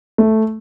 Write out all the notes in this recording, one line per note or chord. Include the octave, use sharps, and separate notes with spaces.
A3